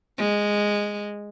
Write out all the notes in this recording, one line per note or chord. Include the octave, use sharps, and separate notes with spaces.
G#3